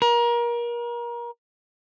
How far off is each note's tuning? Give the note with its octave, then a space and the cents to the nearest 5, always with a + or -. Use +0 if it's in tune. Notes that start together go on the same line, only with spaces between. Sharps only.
A#4 +30